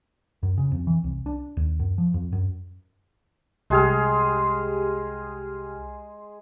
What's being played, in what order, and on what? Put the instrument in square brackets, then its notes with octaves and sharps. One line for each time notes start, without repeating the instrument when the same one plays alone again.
[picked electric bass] F#2
C#3
F2
E3
C2
D4
D#2
F#2
F3
F2
F#2
[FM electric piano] C2 G4 F6 [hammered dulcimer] G#3 G#4